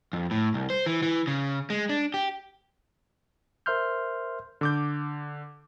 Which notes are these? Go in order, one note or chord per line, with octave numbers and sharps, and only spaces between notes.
F2
A2
C2
C5
E3
E3
C#3
G#3
D4
G4
A#4 C5 E5 C6 F6 G6
D3 D6 G6